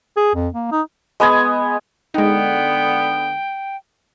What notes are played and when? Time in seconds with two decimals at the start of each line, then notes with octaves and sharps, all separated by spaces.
0.17 G#4
0.35 F2
0.54 A#3
0.72 D#4
1.20 G#3 B3 D#5 G#5
2.14 D3 G#3 B3 D#4 G5